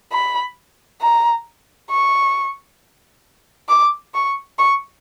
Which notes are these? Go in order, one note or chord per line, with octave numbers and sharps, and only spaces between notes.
B5
A#5
C#6
D6
C#6
C#6